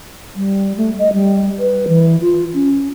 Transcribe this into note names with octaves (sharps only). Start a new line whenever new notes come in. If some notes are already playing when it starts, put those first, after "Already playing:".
G3
A3
D#5
G3
B4
E3
F4
C#4